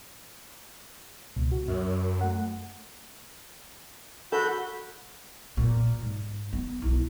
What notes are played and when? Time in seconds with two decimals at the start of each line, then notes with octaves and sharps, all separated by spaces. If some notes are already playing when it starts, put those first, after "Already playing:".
1.36 C#2 B2
1.51 F#4
1.68 F#2
2.21 A3 F#5
4.32 F#4 A4 B5 G6
5.57 A#2
6.02 G#2
6.53 B3
6.82 B1 E4